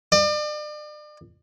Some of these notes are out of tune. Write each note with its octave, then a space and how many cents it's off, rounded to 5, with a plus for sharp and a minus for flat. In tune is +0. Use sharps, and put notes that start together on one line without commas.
D5 +40